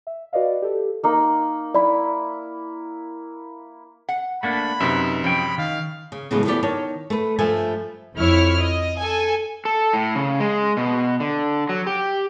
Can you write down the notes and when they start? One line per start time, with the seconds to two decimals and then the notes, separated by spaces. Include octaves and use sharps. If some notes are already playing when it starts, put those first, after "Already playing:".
0.07 E5
0.33 F#4 B4 D5 D#5 F5
0.62 G4 A4
1.04 A#3 D#4
1.74 E4 D5 B5
4.09 F#5
4.43 A3 A#3 D4 F#5 B5
4.80 F#2 C3 D#4 B4 E5
5.24 F3 G#3 C#4 G5 B5
5.58 D#3 F5
6.12 C#3
6.31 A2 C#3 E3 F#3 G#3 B3
6.45 F3 F#3 A3 B3 G4 D5
6.63 D#3 C#5 A5
7.10 A3 B4
7.39 G2 F3 A3 A4 E5 G#5
8.17 F2 E4 C#5 F6
8.61 D#5
8.98 A4 G#5
9.65 A4
9.93 A2
10.15 C#3
10.40 G#3
10.77 B2
11.20 D3
11.69 F#3
11.87 G4